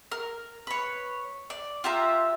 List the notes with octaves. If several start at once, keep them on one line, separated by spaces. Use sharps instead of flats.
A#4
B4 C#5
D5
F4 G4 E5 A#5